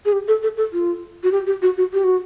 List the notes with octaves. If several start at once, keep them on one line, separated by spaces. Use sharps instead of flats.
G#4
G4
A4
A4
A4
F4
F#4
G4
G4
F#4
F#4
G4
F#4